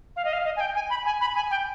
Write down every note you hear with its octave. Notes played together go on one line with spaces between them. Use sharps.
F5
D#5
F5
D#5
G#5
G5
G#5
B5
G#5
B5
G#5
G5